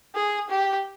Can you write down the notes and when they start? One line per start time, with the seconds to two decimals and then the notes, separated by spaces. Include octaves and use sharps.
0.15 G#4
0.50 G4